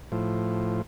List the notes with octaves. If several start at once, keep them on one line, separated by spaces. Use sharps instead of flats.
A2 F3